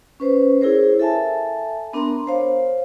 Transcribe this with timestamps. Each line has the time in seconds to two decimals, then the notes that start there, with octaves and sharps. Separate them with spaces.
0.20 C#4 B4 C5
0.60 E4 G#4 A#4 C5 C#5
0.99 A4 E5 G#5 A5
1.93 B3 D4 A#4 A#5 C6
2.27 C5 C#5 F5